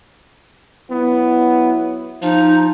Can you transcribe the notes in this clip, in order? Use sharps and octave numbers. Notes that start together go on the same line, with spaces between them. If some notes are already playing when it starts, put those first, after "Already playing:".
F#3 B3 E4
F3 D#4